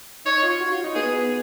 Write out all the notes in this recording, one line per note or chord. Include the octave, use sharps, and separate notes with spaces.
D#4 C#5
F4
F#4
F4
D#4
B3 G#4